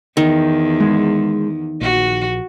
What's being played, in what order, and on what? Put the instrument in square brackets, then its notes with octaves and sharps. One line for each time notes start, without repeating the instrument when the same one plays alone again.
[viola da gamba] E2 [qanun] D#3
[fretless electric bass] G#3
[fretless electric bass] A#1 [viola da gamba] F#4